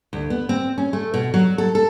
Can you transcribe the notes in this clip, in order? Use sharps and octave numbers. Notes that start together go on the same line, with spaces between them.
D2
B3
C4
C#4
A3
B2
F#3
A4
A4